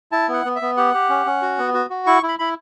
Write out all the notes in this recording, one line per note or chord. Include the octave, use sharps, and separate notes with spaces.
E4 A5
B3 F#5
B3
E5
B3
G4 F#5
G4
C#4
C#4
F#4
B3
F#4
F#4
E4 C#6
E4
B5
E4 B5